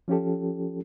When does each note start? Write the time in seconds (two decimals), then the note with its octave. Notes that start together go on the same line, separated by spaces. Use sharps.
0.08 F3 C#4 F4 G4 A4